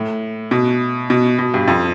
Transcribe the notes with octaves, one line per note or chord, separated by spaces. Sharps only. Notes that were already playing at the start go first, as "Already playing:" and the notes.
Already playing: A2
B2
B2
B2
G2
F2